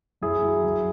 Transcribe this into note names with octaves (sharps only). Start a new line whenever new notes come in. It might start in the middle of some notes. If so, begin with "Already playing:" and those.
F#2 E4 G#4
F#3
F#2